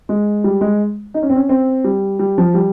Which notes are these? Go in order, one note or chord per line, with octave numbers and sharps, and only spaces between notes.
G#3
G3
G#3
D#4
C#4
C4
C#4
C4
G3
G3
F3
G3